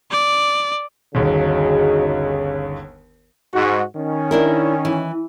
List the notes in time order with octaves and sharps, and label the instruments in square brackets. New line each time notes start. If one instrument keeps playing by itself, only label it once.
[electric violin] D5
[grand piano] G1 D#2 [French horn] C#3 [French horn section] D#4 F#4 G#4
[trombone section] G#2 F#4
D#3 C#4
[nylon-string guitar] D4 E4 A#4
E3